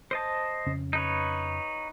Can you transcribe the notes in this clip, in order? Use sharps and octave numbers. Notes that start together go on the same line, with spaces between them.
C5 D#5 A5
F2 C#3 C#4
D#4 B4 C#5